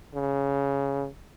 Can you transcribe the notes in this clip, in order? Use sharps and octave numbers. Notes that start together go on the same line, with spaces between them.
C#3